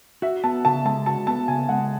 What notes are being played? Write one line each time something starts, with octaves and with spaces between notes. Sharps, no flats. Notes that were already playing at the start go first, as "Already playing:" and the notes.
F#4 E5
B3 A5
C#3 A5
G#3 A5
F#4 A5
B3 A5
C#3 G#5
G#3 F#5